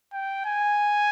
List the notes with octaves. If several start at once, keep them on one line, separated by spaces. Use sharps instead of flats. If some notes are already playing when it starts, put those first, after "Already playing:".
G5
G#5